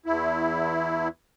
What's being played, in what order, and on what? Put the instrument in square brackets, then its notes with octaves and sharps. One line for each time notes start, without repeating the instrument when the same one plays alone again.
[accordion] E2 E4